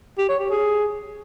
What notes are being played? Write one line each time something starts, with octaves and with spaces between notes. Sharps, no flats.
G4
C#5
G4
G#4